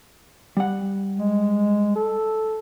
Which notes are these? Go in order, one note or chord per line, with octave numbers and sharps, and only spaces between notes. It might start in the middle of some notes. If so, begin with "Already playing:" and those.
G3 F#5
G#3
A4